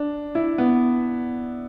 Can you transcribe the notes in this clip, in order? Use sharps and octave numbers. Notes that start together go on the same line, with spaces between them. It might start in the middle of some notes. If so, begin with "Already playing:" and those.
Already playing: D4
E4
B3